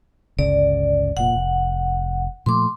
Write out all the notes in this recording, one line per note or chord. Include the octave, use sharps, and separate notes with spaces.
G1 C#2 C#3 D5
F1 A#2 F#5
F1
A#2 F3 A3 C6 D6